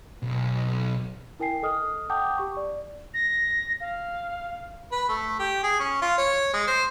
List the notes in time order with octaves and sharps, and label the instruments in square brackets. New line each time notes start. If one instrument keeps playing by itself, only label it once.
[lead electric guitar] B1
[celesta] E4 A#4 G5 G#5 C7
A4 D#5 D#6 F6
F#5 G5 A5 D6 D#6 G6
G4 C#6
D5
[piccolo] A#6
F5
[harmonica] B4
A3
G4
G#4
C#4
F4
C#5
G#3
C5